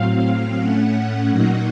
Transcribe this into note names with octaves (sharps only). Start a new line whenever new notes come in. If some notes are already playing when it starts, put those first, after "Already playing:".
Already playing: A2 F#3 C4 F5
A2 A3 C#4 F#5
A#2 F#3 A#3 D#4